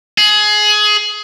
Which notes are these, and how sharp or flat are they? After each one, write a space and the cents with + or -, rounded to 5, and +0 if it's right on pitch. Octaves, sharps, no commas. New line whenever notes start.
G#4 +20